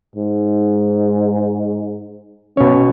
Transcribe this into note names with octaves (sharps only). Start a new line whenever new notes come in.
G#2
B2 C#4 C#5